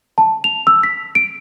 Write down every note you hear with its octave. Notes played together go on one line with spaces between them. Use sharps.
A5
F7
E6
B6
D7